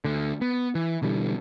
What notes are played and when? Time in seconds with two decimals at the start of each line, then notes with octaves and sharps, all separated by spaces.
0.05 D2 D3
0.41 B3
0.75 E3
1.02 B2 D3 E3 G3